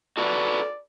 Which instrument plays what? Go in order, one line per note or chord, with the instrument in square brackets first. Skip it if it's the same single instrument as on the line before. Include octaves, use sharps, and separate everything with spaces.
[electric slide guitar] F#4 A4 B4 [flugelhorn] D5